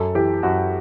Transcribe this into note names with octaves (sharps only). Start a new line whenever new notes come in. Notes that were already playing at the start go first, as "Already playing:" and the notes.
Already playing: F#2 A4
E3 G4
F#2 F#4